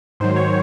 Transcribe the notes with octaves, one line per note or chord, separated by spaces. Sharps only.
G#2 D#3 F#3 C5
C#5